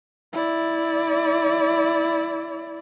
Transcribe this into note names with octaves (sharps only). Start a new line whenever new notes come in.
E4 D5